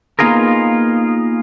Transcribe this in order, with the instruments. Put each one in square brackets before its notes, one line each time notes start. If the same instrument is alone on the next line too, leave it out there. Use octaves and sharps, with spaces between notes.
[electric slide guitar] A#3 B3 D#4 F4 G#4 A#4